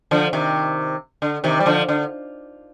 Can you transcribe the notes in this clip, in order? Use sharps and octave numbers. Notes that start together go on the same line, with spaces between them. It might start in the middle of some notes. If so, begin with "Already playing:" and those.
D3 F3
C3 D#3
D3
C3 D#3
G3
D3 F3
D3